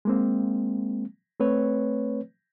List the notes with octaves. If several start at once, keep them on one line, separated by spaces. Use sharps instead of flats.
G#3 A#3 C4
A3 C4 B4 C#5